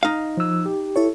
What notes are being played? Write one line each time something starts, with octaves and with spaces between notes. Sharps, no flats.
D#4 F5
F3 E6
G4
E4 A4 C#5